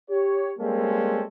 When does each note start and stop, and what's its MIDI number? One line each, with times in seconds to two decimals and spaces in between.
0.10 0.53 67
0.10 0.53 73
0.59 1.23 55
0.59 1.23 56
0.59 1.23 58
0.59 1.23 60
0.59 1.23 61
0.59 1.23 69